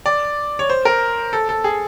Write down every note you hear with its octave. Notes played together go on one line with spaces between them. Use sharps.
D5
C#5
C5
A#4
A4
A4
G#4